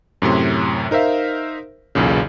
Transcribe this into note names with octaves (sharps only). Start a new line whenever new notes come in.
F#2 A2 C3 C6
D#4 A#4 C5 E5 F5
B1 E2 A#2 C#3